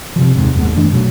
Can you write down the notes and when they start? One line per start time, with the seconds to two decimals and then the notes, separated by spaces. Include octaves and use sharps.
0.16 C3 F3
0.35 D#2 G#2 C3
0.55 D#1 D#2 G#2 B3
0.76 G2 E3 A3 D4
0.93 B2 F#3 A3